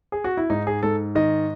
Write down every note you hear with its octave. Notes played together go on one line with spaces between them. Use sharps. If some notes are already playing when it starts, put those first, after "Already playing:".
G#4
F#4
E4
G#2 D#4
G#4
G#2 A4
D#3 D#5